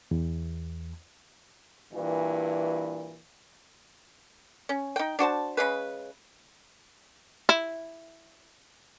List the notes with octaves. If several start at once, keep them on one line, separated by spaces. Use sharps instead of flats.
E2
G2 A#2 E3
C#4
D#4 G5
D4 F#4 C5 A5
C#3 G#3 B4
E4